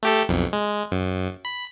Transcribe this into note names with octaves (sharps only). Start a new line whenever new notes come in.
A3 G4 A4
B1 F2
G#3
F#2
B5